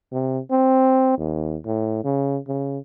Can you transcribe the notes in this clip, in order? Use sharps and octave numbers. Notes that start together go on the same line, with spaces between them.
C3
C4
D#2
A2
C#3
C#3